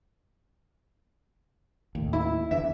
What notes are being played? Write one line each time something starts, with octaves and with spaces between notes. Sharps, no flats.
D#2 A2
E4
E2 D3 E3 E5